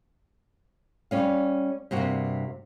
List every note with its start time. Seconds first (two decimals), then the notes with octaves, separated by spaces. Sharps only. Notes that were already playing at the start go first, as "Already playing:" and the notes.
1.11 G3 C#4 F5
1.91 G2 C3 A#3 F#4